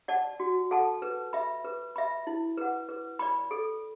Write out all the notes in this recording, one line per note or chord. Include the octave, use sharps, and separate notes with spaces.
D5 F#5 A5
F#4
A4 F#5 A5
B4
E5 B5
B4
E5 B5
E4
B4 F#5
B4
D5 B5
A4